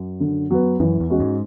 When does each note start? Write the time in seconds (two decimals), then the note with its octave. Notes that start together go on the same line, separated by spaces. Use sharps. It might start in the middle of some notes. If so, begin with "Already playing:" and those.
Already playing: F#2
0.20 D3
0.51 F#3 B3
0.80 F#2 E3
1.00 E2
1.10 G#3 C#4 F#4
1.20 G#2